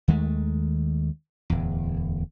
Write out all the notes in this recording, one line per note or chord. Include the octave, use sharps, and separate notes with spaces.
D#2 D#3 G#3 A3
D1 E2